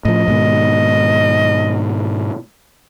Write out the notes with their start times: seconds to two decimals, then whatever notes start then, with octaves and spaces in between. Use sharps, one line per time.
0.05 A2 F3 D#5
0.28 G#2 B2 D#3